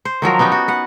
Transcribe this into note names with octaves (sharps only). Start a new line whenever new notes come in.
C5
D#3 F3 F#3 A#4
B3 C#4 D#4 G4
F#4
B4 F#5